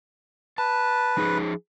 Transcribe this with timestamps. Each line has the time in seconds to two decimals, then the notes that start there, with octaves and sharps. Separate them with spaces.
0.58 B4 A5
1.17 F3 D#4 G#4